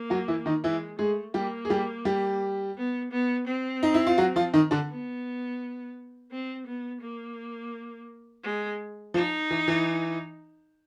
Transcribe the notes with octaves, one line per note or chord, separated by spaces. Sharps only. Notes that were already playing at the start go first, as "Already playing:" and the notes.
Already playing: A#3
F#3 F#4
E3 E4
D#3 D#4
E3 G#3 E4
G#3 A3 G#4
G3 A#3 G4
G#4
G3 G4
G3 G4
B3
B3
C4
D#4
E4
F4
F#3 F#4
F3 F4
D#3 D#4
D3 D4
B3
C4
B3
A#3
G#3
F3 D#4
E3
E3